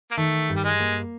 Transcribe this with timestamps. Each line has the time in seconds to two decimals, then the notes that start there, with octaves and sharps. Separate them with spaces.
0.11 A#3
0.17 D#3 A3
0.49 G2
0.56 G3
0.64 G#3
0.80 A#3